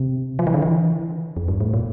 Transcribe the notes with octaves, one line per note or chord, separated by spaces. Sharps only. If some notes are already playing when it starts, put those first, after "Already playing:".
Already playing: C3
F3
E3
D3
E3
F2
G2
A2
A#2